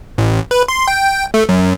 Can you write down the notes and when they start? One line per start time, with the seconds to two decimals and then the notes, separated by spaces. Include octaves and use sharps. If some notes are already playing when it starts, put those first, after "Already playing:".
0.18 A1
0.51 B4
0.68 C6
0.88 G5
1.34 A3
1.49 F#2